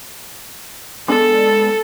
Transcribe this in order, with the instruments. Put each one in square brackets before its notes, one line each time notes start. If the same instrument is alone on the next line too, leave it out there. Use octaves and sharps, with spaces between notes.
[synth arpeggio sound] G#3 B3 D4 [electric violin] A4